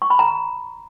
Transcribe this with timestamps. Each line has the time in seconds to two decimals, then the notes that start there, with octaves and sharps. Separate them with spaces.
0.02 C#6
0.10 B5
0.19 A#5